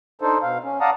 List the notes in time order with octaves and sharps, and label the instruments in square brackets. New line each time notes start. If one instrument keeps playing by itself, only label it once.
[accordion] D4 D#4 A4 C5
B2 F5
C#4
D5 F5 F#5 A5 A#5 D#6